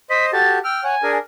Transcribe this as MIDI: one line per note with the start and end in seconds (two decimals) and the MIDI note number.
0.10 0.31 72
0.10 0.31 75
0.10 0.26 95
0.33 0.59 66
0.33 0.59 67
0.33 0.59 69
0.33 0.54 93
0.64 0.84 79
0.64 0.81 88
0.64 0.84 89
0.84 0.95 73
0.84 0.95 78
0.84 1.12 80
1.03 1.18 62
1.03 1.18 68
1.03 1.18 70